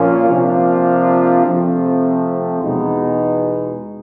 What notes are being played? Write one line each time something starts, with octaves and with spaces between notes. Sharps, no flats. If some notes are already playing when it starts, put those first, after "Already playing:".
Already playing: A#2 F3 A#3 C#4 F4
C3 F3 A#3 D4 F4
C3 F3 A3 C4
E2 B2 G#3 B3 D#4